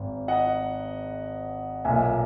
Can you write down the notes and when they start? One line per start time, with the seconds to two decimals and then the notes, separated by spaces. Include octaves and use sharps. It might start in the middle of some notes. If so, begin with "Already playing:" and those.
Already playing: G#1 G#2
0.28 D#5 F#5
1.85 B1 A#2 E5 G#5